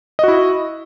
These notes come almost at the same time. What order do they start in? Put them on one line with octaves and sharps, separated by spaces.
D#5 F#4 E4